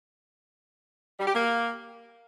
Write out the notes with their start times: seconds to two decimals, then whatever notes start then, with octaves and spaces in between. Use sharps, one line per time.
1.19 G3
1.26 G4
1.33 A#3